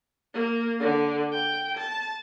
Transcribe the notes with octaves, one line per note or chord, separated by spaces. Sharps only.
A#3
D3
G5
A5